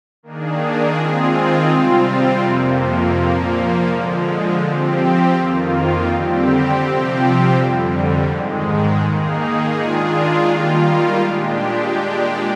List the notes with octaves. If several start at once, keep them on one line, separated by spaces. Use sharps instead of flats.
D#3 A#3 D4 G#4
D#3 G#3 C4 F4 G#4
C3 G3 C4 F4
F2 C3 F3 A#3
A#2 F3 A#3
D3 F3 G#3
F3 C4 G4
F2 D#3 A#3 F4
D3 G3 C4 G4
C3 F3 C4 G4
F2 D3 G3
G#2 D#3 G#3
D#3 A#3 D#4 G#4
D#3 G#3 D4 F4 G#4
D#3 G3 A#3 F4
A#2 G#3 D4 G4